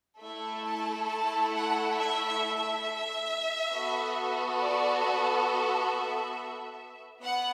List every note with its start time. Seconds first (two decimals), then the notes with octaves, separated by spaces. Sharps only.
0.21 A3 E4 A4 E5
0.65 A5
1.09 A5
1.53 F#5
1.96 E5
2.26 E5
2.55 E5
3.72 B3 F#4 A4
4.59 D5
5.03 E5
7.22 B3 F#5